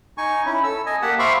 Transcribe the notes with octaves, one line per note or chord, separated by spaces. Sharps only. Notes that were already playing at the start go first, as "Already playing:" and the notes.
D#4 G#5 C#6
C#4 E4
A4 E6
D#5 G#5
A#3 G4 F#5 A5
C5 E5 F5 B5 C#6 D6